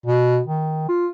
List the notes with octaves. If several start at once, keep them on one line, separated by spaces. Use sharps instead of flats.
B2
D#3
F4